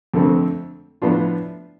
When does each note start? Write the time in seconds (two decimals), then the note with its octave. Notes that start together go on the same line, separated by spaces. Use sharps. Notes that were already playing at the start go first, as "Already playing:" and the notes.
0.14 F2 D3 A3 C4
1.02 A2 F3 B3 D4 F4